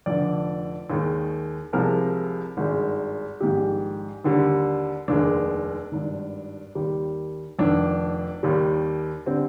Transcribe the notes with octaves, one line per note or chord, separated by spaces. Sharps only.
F1 F2 D3 D5
D#2 D#3 G#3
C2 C3 F3 G#3 A#4
G#1 G2 D#3 G#3
A#1 G#2 D#3 G3 G4
D#2 D3 G3
F1 D#2 D#3 G#3 D4
G#1 G2 D#3
D#2 D#3 G3
F1 F2 D#3 D4
D#2 D#3 G3
D3 G3 C4